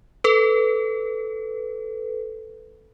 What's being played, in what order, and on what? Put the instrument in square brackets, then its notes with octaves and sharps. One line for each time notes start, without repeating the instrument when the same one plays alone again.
[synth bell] A4 B4